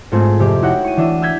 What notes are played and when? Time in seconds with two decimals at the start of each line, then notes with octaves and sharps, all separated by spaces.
0.12 G#2 A3 C4 F4 G#4
0.39 F2 C3 G4 D6
0.62 D#4 E4 F#4 C#5 F#5 G5
0.84 C#6 D#7
0.97 E3 D4 E5 D#7
1.22 E6 F6 G6 G#6 B6